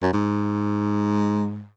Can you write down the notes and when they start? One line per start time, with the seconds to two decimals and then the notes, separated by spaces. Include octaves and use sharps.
0.02 F#2
0.13 G#2